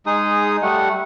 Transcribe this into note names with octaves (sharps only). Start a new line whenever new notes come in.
G#3 D#4 G#4 D#6
G3 A3 F#5